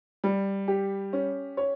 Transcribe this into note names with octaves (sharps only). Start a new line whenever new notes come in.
G3
G4
C#4
C#5